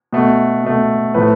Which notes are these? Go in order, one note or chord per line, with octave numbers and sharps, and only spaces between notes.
B2 A3
B2 A3
A2 F3 A3 B4